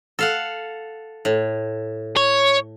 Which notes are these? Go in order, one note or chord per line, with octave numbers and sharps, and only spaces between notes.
A4 F5 F#5
A2
C#5